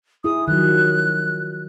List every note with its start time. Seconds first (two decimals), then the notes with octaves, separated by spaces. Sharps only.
0.24 E4 G#4 D#6
0.48 D#3 F3 F#3 F#6